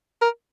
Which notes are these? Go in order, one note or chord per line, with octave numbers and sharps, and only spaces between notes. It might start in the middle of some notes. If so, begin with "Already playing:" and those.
A#4